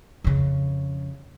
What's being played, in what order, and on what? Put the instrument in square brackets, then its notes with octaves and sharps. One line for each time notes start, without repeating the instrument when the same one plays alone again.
[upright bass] F2 C#3